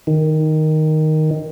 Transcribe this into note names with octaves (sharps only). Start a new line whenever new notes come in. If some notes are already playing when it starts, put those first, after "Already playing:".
D#3